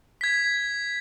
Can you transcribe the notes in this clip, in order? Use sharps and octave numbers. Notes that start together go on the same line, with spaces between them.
G#6 B6